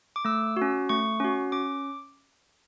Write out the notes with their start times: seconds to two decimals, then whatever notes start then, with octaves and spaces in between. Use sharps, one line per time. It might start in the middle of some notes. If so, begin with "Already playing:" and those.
0.16 D6
0.25 A3 E6
0.57 F#4
0.62 C#4
0.89 A3 C#6
1.20 C#4 F#4
1.52 C#4 D6